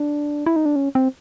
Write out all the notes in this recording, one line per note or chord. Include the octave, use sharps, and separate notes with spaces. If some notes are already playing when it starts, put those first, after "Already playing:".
Already playing: D4
E4
D#4
D4
C#4
C4